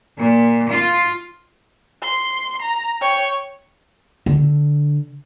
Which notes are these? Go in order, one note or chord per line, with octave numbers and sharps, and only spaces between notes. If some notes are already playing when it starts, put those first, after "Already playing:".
A#2
F4
C6
A#5
C#5 G5
D3